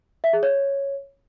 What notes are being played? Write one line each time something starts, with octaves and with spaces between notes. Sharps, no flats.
E5
G#4
C#5